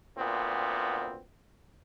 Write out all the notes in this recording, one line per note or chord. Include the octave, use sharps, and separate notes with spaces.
D2 A#2 B3 C4